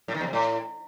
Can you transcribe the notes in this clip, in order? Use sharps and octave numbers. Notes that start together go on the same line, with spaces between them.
A2
D#3
E2
C3
A2